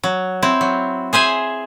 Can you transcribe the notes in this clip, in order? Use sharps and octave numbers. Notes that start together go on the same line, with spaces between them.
F#3
C4 E4
F#3
G#4 C5 E5 G#5